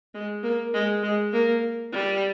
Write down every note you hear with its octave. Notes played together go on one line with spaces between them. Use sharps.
G#3
A#3
G#3
G#3
A#3
G3